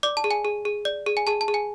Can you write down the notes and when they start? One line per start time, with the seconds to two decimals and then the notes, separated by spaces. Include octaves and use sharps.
0.03 D5 D6
0.17 A5
0.24 G#4
0.31 G#5
0.45 G#4
0.65 G#4
0.85 D5
1.06 G#4
1.17 G#5
1.27 G#4 A5
1.41 A5
1.48 G#4
1.54 G#5